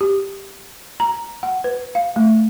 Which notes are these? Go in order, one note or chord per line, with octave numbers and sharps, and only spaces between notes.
G4
A#5
F#5
B4
F5
A3